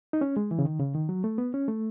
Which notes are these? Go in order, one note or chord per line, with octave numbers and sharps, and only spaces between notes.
D#4
C#4
G#3
E3
C#3
D#3
C#3
D#3
F#3
A3
B3
C#4
A3